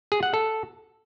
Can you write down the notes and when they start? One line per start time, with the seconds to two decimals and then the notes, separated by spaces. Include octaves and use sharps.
0.12 G#4
0.23 F#5
0.34 A4